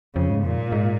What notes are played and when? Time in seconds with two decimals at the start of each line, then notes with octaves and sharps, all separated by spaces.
0.15 F2 C#3
0.30 G#2
0.44 F2 A#2
0.58 G#2
0.72 G#2